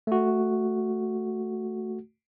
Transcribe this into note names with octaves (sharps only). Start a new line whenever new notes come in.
A3 F#4